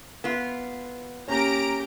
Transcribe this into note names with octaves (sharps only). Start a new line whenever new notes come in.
B3 F4
A#3 C#4 G4 A#5 D7